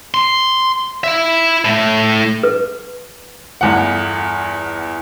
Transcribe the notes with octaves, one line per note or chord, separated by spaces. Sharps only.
C6
E4 E5
A2 A3
B4
G1 E2 F#5